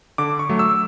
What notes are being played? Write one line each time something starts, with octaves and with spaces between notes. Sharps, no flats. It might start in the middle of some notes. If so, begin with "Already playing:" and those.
D3 D6
C#6
F#3 A3
E6